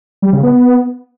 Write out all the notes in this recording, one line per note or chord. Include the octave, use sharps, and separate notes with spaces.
G3
C#3
B3